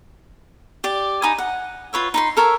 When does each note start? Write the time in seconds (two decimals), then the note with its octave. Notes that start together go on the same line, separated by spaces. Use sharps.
0.84 G4 D5
1.22 D#4 G#5 B5 D#6
1.38 F#5
1.93 F4 B4 C#5 E5
2.14 D#4 B5 C6
2.37 A4 A#4 C#5 E5